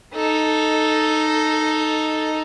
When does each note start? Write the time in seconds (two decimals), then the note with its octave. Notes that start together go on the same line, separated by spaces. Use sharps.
0.15 D#4 A4